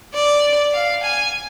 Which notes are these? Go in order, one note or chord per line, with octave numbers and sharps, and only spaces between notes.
D5
F5
G#5